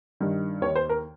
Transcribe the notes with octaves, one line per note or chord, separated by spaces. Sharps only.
G2 D#3
D#2 D#3 C#5
C5
A#4